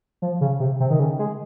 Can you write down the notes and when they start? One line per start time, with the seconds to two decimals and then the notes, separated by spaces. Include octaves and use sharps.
0.22 F3
0.41 C#3
0.60 C3
0.80 C3
0.90 D#3
1.00 C#3
1.19 G#3